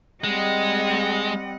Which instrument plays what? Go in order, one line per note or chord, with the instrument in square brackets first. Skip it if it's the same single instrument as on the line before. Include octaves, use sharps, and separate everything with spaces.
[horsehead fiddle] G3 C4 [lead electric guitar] G#3 [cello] D#5 F#5